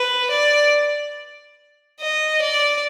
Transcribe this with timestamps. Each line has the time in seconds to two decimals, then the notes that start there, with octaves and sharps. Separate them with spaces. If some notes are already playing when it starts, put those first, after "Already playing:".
Already playing: B4
0.31 D5
2.00 D#5
2.42 D5